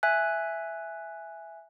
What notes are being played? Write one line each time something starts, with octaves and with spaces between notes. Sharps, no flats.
E5 G#5 F#6